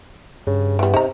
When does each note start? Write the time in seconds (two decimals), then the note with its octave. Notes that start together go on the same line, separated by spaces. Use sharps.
0.47 G2 C#3
0.79 E3 G3 B3
0.94 C3 D#4 A#5